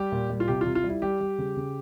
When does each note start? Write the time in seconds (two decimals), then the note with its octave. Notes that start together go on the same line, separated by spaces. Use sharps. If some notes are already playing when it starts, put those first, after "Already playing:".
Already playing: G3 G4
0.12 A#2
0.30 G3
0.40 F4
0.48 C3 G4
0.61 F4
0.66 C3
0.75 F4
0.84 G3
0.89 E4
1.02 G3 G4
1.21 G3
1.38 C#3
1.57 C#3